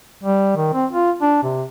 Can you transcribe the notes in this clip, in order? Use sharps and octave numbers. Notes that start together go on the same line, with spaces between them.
G3
D#3
C4
F4
D4
C3